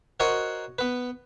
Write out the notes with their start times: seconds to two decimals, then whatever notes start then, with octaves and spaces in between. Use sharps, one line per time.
0.20 F#4 A#4 C5 C#5 D#5 F#5
0.79 B3 B4